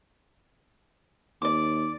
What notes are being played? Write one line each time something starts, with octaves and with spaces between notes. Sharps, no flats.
D#2 D5 D6